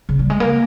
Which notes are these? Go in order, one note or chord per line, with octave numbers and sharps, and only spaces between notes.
C#3
G3
G#3
A#3